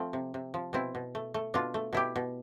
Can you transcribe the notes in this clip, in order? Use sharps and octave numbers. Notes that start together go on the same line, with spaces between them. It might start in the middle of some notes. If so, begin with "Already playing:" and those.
Already playing: F3 A3 C4
C3
C3
F3
B2 C4 E4
B2
A3
A3
B2 D4 F4
A3
B2 E4 G4
B2